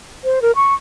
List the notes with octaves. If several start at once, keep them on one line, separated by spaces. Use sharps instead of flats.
C5
A#4
C#6